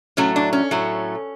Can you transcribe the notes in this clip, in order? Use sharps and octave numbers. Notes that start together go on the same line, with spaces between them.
A2 F#3 A3 C#4
D4
C#4
A2 F#3 A3